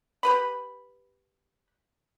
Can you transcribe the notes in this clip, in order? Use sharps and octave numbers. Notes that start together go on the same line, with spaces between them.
G4 B4 B5